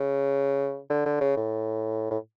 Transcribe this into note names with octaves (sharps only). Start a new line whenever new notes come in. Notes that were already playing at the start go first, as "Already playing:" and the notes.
Already playing: C#3
D3
D3
C#3
A2
A2